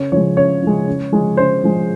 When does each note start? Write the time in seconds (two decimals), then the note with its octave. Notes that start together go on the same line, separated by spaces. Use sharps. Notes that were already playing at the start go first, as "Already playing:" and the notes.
Already playing: C#3 C#5
0.12 F3 G#3 C#5
0.37 C#3 C#5
0.62 F3 G#3
0.87 C#3
1.12 F3 G#3
1.37 C#3 C5
1.63 F3 G#3